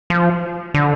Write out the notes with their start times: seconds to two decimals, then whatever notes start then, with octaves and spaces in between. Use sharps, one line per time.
0.10 F3
0.74 D3